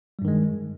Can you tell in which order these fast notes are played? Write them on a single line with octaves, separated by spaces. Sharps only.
G3 G2 D#3 G#3